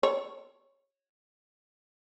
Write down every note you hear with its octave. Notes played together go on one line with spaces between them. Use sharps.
C#5